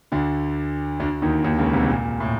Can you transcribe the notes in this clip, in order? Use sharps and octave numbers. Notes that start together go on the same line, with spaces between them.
D2 D3
D2 D3
D#2 D#3
D#2 D#3
C#2 C#3
C2 C3
A#2
A2